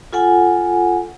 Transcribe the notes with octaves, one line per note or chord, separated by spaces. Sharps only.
F4 A4 F#5 G#5